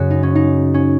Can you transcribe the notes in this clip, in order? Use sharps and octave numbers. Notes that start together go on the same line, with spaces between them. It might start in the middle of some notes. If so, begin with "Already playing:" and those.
Already playing: F#2 C#3 F#4 G#4
D#4
C#4
D#4
C#4